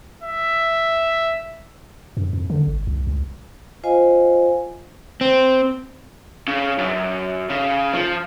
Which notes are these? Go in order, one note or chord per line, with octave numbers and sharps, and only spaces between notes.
E5
F#2
F2
D3
G#1
C2
C#2
F4 C5 D#5 F5 G#5
C4
C#3
F#2
C#3
F3